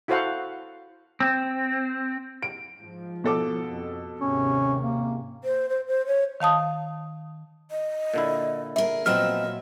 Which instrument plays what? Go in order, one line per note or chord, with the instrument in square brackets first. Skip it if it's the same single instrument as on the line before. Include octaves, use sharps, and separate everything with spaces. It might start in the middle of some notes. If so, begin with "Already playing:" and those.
[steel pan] E4 F#4 A4 C5 F5 F#5
[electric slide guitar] C4
[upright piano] D7
[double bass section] G#2 F3
[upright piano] B2 A4 D6
[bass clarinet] F2
[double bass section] G#1 D#2 C3 [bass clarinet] C#4
[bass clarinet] A#3
[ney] C5
C5
C5
C#5
[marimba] D#3 F5 A5 D#6
[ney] D#5
[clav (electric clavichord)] A#2 D3 E4
[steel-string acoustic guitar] G#4 A#4 [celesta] E5
[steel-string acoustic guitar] A#2 F#3 E5 [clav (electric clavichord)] F3 B3 C4 [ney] D#5 [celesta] F6